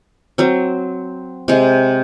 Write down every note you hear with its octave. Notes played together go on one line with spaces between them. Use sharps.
F#3 C4
C3 G#3